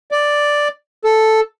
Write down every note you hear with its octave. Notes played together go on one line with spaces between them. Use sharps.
D5
A4